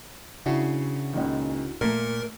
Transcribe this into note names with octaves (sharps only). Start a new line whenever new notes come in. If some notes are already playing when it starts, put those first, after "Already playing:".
C#3 D4 E4 F#4
C#2 A#2 D#3
A#2 A3 A#3 A#4